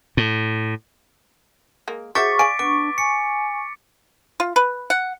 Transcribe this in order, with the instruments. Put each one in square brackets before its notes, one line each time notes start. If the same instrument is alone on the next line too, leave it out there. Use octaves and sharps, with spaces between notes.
[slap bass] A2
[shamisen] G#3 A#3
[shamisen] F#4 C5 E5 [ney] G#4 [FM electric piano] C#6 [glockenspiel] D6 A6 B6
[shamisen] D5 F5 G#5 [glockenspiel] D7
[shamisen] B3 [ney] D4 [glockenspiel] D6
[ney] G#5 [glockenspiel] C#7
[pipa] F4
B4
F#5